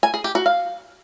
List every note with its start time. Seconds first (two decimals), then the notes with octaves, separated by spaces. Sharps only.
0.03 G#5
0.14 G#4
0.24 G4
0.35 F#4
0.46 F5